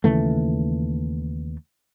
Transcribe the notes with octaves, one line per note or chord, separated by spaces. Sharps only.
D#2 C#3 E3 A3